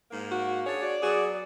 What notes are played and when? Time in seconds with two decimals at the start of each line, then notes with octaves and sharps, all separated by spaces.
0.10 G#2 A#3
0.31 F#4
0.66 D4 G#4 C#5
0.82 F#4 D5
1.03 F#3 B3 F#4 G#4